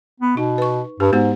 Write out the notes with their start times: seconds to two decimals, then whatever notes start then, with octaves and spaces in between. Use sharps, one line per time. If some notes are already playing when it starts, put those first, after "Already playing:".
0.20 B3
0.37 B2 D#4
0.58 B4 C#6
1.00 G2 G4
1.13 G#2 G#3 B3 F#4